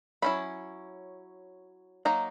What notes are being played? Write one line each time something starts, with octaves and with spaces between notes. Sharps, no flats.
F#3 C#4 E4 B5
F#3 A#3 D#4 A#5